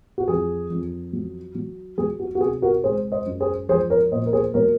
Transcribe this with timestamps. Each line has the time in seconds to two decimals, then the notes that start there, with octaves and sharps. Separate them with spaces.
0.18 F#4
0.28 F2 G#4
0.70 F2
1.13 F#3
1.55 F#3
1.98 F#3 G#4
2.20 F#4
2.35 F#4
2.41 C3 G#4
2.62 F#4 A#4
2.83 G#3 G#4 C5
3.12 C5 D#5
3.26 F#2
3.40 G#4 C5
3.69 F3 G#4 C5
3.90 A#4 C#5
4.11 A#2 C5 D#5
4.26 A#4
4.33 G#4 C5
4.54 F#3 A#4 C#5